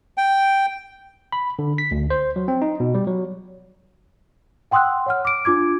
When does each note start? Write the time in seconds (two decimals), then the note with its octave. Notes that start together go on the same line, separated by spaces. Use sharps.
0.18 G5
1.32 B5
1.59 D3
1.78 B6
1.91 D2
2.10 C5
2.36 F#3
2.48 C4
2.62 D#4
2.80 B2
2.94 G3
3.07 F#3
4.71 F#5 G5 C6 D#6 E6 F#6
5.06 C#5 F#5 F6
5.25 D6 D7
5.45 D4 F4 D6 G#6